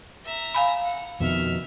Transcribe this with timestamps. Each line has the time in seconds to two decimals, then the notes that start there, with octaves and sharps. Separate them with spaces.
0.25 E5 A#5
0.54 F5 G#5 B5
0.84 F#5
1.20 F2 B2 D#3 E5 F6